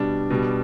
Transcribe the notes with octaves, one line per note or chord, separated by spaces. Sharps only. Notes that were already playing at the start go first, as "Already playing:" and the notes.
Already playing: B2 G3 D4
B2 G3